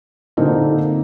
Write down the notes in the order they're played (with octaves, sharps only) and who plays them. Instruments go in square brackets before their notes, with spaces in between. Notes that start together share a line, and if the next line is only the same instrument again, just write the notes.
[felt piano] A#2 D3 A#3 C4 D#4